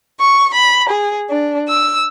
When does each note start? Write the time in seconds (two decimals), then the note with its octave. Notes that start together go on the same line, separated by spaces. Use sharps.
0.20 C#6
0.53 B5
0.88 G#4
1.30 D4
1.69 E6